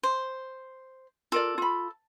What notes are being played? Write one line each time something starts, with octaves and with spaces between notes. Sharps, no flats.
C5
F4 A4 A#4 D5
F4 B5